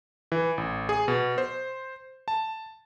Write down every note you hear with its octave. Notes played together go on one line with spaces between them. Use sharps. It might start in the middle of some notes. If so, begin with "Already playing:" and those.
E3
A1
G#4
B2
C5
A5